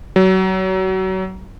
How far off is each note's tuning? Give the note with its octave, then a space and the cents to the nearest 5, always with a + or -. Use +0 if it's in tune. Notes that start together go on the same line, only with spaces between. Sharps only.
F#3 +30